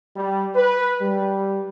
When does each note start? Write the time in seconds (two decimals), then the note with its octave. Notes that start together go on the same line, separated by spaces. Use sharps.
0.17 G3
0.56 B4
1.02 G3